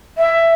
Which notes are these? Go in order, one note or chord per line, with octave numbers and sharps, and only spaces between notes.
E5